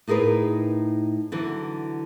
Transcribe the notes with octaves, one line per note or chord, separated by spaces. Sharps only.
A2 D#4 G#4 A#4 B4
D3 E3 F#3